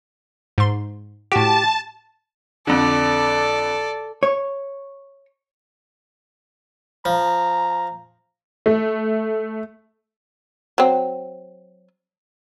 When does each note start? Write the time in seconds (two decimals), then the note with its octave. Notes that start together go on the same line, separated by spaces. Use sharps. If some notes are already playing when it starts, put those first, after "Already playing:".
0.58 G#2 C6
1.32 A2 F#4 G4 A5
2.67 F2 D3 A4 D5
4.23 C#5
7.05 F3 A#5
8.66 A3
10.78 F#3 C4